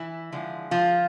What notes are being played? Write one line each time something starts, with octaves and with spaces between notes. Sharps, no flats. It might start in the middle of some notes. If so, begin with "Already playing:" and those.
Already playing: E3 E4
D3 F3 G#3
F3 F4